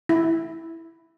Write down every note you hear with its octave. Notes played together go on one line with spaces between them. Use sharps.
E4